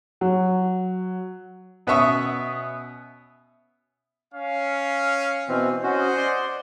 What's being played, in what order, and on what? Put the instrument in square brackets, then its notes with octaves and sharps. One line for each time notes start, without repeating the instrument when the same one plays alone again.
[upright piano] F#3
[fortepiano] B2 B3 C#4 E5 C#6 D#6
[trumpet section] C#4 F5
[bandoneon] B2 E3 C4
[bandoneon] C#4 F#4 [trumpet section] C5 D#5 F#5
[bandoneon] D5 C6